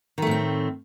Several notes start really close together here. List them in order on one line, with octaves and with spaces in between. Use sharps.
D#3 A3 A2 C4